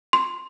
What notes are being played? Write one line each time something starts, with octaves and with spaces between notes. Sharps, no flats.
C6